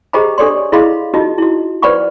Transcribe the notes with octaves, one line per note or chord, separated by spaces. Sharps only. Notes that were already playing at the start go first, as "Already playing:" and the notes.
G4 G#4 C5 D#5 A#5 B5
D4 G4 A4 C#5 D5 C6
E4 G#4 D#5 F5 B5 C6
D#4 F4 F#4 D#5
E4 F#4
B4 C5 D5 F#5 B5 C#6